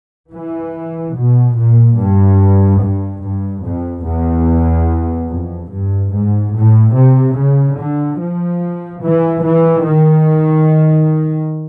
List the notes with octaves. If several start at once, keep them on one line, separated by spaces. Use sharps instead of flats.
E3
B2
A#2
G2
G2
G2
F2
E2
F2
G2
G#2
A2
C3
C#3
D3
F3
E3
E3
D#3